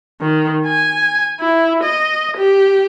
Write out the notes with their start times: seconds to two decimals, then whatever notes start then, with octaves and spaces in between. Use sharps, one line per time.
0.21 D#3
0.67 G#5
1.40 E4
1.83 D#5
2.38 G4